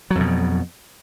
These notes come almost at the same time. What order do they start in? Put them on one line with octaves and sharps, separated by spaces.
F#3 F2 B2